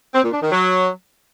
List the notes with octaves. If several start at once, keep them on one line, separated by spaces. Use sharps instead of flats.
C4
A#2
D4
D#3
F#3